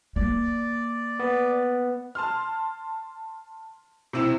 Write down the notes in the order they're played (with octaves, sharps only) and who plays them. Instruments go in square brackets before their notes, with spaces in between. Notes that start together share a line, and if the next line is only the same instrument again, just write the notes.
[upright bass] A#3 [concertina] D5
[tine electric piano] B3
[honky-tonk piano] A5 C6 F6
C3 C4 E4 E6 E7